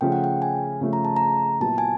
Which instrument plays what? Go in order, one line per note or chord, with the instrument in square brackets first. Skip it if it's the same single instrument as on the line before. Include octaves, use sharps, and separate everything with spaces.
[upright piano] C#3 F3 A3 [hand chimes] G5
[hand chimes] F#5
G5
G#5
[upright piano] C#3 F3 A3
[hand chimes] A#5
A5
A#5
[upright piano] A#2 F#3 B3 E4 [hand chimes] A5
[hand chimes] G#5